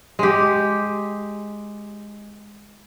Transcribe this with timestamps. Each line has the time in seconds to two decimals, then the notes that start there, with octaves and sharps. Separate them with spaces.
0.19 G#3 G4